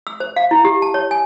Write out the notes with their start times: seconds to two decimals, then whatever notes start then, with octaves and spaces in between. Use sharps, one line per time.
0.07 E6
0.20 C5
0.36 F5
0.51 E4
0.65 G4
0.82 A5
0.94 C#5
1.11 G#5